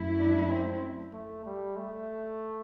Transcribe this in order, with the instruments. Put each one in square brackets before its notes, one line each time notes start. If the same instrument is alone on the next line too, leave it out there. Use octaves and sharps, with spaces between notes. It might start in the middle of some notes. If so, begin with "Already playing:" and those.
Already playing: [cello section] F#2 F#3 A3 E4
[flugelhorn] D4
C4
A3
G3
A3